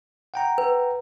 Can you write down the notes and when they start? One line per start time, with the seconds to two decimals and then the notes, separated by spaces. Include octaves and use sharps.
0.34 F#5 G5 A#5
0.58 B4